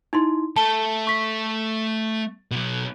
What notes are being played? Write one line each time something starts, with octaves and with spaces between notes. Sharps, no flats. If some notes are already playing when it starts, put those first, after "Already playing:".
D#4 E4 C6
A3 A5 G7
C#6 B6
B2 F#3